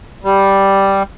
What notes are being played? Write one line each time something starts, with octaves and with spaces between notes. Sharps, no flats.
G3